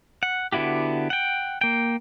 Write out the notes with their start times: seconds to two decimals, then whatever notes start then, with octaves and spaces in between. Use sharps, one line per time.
0.23 F#5
0.52 D3 B3 E4 F#4 G4
1.10 F#5 G5
1.61 A#3 G5